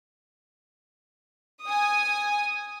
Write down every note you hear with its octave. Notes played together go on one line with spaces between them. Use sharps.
G#5 D#6